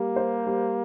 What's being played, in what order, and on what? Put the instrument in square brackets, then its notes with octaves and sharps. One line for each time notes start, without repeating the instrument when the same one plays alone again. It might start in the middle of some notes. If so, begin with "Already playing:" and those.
Already playing: [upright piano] G3 [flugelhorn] A#3
[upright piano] C5
G3